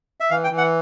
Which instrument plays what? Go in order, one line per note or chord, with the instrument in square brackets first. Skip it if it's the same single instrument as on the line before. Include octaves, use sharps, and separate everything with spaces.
[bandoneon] E5
E3 F5
G5
E3
F#5